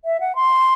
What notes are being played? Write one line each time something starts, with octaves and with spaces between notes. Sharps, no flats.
E5
F#5
C6